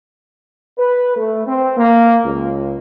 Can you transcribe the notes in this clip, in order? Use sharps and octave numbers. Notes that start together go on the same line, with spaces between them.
B4
A3
C4
A#3
C#2